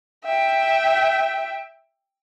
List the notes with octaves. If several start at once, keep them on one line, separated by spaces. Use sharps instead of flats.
E5 G5